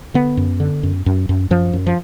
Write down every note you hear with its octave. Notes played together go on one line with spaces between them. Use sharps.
D3 B3
F#2
D3
F#2
F#2
F#2
F#2 F3
F#2
F3